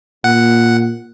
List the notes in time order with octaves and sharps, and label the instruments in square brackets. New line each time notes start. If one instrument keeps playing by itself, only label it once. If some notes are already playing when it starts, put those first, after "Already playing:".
[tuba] A#2 [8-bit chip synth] F#5